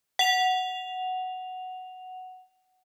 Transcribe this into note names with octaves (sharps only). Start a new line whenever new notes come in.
F#5 F7